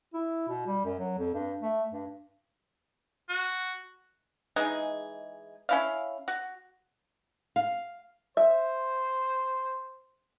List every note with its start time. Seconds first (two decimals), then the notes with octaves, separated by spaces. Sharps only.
0.14 E4
0.49 B2
0.67 G3
0.85 F#2
0.99 F#3
1.18 F2
1.34 G2
1.62 A3
1.92 G2
3.29 F#4
4.56 E3 G#3 D#4 G#4
5.69 C#4 E4 F5
6.28 F#4
7.56 F5
8.37 C5 E5